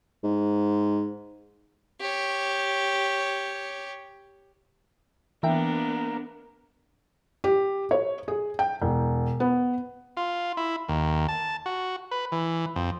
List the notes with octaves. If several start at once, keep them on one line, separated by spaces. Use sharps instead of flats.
G#2
G4 C#5
E3 A#3 B3 D4 A#4 E5 G5
G4
C#5
G#4
G5
E1
B3
F4
E4
D#2
A5
F#4
B4
E3
F2